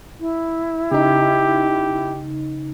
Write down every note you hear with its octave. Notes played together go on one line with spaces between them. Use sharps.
E4
C#3 D#4 G4